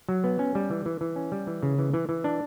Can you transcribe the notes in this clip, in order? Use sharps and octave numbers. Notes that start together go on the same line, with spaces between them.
F#3
B3
C#4
G3
E3
E3
E3
C#4
G3
E3
C#3
E3
E3
E3
D4